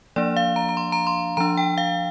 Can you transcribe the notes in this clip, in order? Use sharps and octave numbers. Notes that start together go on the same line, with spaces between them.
F3 A#3 D4 D5
F5
A#5
A#5
C6
A#5
C6
F3 D4 A#5
G5
F5